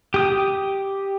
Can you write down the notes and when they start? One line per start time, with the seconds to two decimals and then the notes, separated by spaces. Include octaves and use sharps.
0.14 G4 D#6